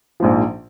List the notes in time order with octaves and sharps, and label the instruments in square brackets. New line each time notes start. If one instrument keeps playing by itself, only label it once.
[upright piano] A#1 G#2 F3